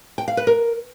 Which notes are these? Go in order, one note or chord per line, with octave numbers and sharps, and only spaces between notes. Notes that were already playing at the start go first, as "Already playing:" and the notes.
G5
F5
B4
A#4